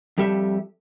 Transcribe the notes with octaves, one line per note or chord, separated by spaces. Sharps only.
F2 G3 G4 A4 E5